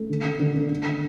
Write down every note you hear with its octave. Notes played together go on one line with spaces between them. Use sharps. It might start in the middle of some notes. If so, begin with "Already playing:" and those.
Already playing: A3
D3
D3
D3
D3
D3